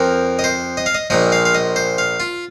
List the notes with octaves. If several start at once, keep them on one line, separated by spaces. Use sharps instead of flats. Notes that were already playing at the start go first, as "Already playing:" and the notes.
Already playing: F2 F3 A#4
D#5
C5
D#5
F5
D#5
A#1 A#2 F3 D#5
F5
F5
D#5
C5
F5
F4